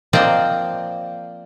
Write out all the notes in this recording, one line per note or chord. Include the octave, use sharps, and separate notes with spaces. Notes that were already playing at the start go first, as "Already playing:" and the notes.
F3 A#3 C4 C5 D5 D#5